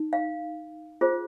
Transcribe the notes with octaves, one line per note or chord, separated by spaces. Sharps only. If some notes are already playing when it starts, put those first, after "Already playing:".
Already playing: D#4
F5
F4 G#4 C5